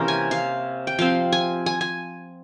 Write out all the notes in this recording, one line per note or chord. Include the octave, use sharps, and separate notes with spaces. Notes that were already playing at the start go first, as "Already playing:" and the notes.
Already playing: C3 E3 A#3 C#4 A#4 C5
G#5
F5
G5
F3 C4 F5
G#5
G#5
G#5